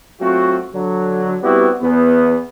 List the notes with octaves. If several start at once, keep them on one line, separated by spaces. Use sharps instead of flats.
F#3 A3 C4 F4 F#4
D3 F#3
G3 B3 C4 E4 F#4 G4
E2 B3